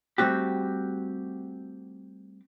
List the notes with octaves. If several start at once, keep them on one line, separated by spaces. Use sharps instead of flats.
G3 A3 C4 F#4 G4